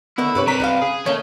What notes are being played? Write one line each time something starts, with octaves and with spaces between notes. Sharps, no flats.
D3 D#3 A3 B3 E4
G2 C3 A4 B4 C#5
C3 G3 A#4 B4 A#5 B6
B1 B4 D#5 F5
C#3 G#4
D#3 A3 A#3 C#4 C#5